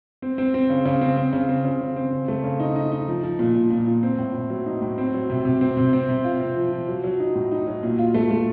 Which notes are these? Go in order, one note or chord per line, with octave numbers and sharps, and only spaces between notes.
C4
C4
C4
C#3
C#3
C4
C4
C#3
C4
C#3
C#3
C4
C#3
A3
C#3
D#4
D#4
D#4
F3
F3
A#2
A#2
A#2
A#2
C4
A2
A2
F#3
D#4
A2
C4
F#3
C3
C3
C4
C3
C4
C3
F4
C4
F3
F3
F#3
F#3
D#4
A2
D#4
F#3
A#2
F4
A3
A3